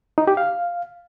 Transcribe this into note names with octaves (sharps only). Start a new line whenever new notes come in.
D#4
G4
F5